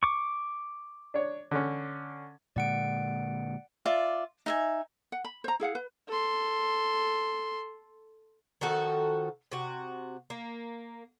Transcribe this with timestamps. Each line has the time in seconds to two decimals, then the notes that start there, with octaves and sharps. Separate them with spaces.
0.03 C#6 D6
1.14 D4 C#5
1.51 D3 C#4
2.56 A#2 D3 G#3 D5 F#5 D7
3.86 F4 D5 E5
4.46 D#4 E5 G#5
5.12 F#5
5.24 B5
5.44 C5 A#5
5.60 E4 G#4 F5 F#5
5.75 B4
6.08 A4 C6
8.61 D#3 F3 F#4 A4
9.51 C3 F#4
10.30 A#3